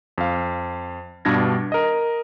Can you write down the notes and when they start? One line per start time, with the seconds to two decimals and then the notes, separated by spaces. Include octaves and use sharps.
0.18 F2 F5
1.25 G2 B2 G3 D4 G#6 A#6
1.72 A#4 D#5